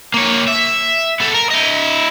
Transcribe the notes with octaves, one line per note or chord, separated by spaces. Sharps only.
A#3 C#5
E5
B3 A4
A#4
E4 D#5